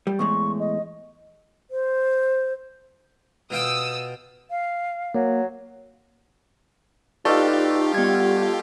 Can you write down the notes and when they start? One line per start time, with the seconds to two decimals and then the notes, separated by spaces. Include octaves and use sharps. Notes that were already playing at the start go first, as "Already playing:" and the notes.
0.07 G3
0.19 E2 A2 G#3 C#6
0.60 D#5
1.71 C5
3.50 B2 F4 G5 D#6 E6
4.50 F5
5.14 F#3 A#3
7.25 A3 D#4 F4 G4 B4 D5 D#5 F5
7.94 G3 B3 G#6